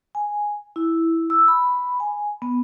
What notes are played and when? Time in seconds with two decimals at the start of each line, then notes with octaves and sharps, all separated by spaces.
0.15 G#5
0.76 E4
1.30 E6
1.48 B5
2.00 G#5
2.42 B3